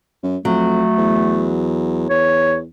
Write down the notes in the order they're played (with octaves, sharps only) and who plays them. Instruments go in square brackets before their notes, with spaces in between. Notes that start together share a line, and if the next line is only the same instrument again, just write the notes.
[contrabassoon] F#2
[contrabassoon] F2 [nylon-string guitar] F#3 [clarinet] A3
[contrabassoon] E2
[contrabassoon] E2 [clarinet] C#5